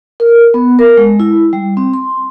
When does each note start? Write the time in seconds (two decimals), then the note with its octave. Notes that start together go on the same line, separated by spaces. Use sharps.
0.20 A#4
0.54 B3
0.79 A#4
0.97 G#3
1.20 E4
1.53 G3
1.77 C4
1.94 C6